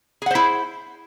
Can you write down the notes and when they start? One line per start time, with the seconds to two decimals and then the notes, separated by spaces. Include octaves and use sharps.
0.22 G#4
0.26 F#5
0.31 C5
0.35 E4